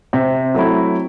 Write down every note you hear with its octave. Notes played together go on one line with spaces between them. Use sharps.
C3 C4
F#3 A3 E4